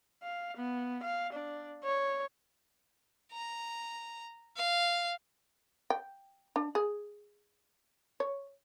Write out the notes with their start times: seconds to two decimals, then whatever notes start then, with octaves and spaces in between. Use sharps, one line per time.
0.23 F5
0.57 B3
1.03 F5
1.33 D4
1.84 C#5
3.32 A#5
4.56 F5
5.90 G5
6.56 D4
6.75 G#4
8.20 C#5